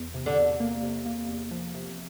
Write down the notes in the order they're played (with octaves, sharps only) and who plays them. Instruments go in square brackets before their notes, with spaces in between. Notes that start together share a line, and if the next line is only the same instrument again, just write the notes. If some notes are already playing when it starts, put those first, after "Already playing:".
Already playing: [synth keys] E2
C3
[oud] D3
[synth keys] E2
A#3
C3
A#3
E2
F3
C3